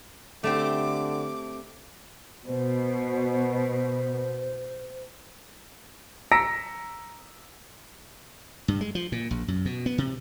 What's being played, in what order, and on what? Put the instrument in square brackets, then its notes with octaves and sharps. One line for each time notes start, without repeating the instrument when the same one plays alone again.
[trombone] D3 [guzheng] A3 C4 G4 [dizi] D6
[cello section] B2 [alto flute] C5
[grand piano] A#5 E6 A#6 B6 C#7 D7
[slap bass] G2
G#3
F3
A#2
A#1
F#2
B2
B3
C3